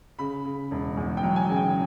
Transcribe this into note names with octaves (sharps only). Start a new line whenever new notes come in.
C#3 B5
C#3
E1
E2
G5
F#3
G#5
C#3
G5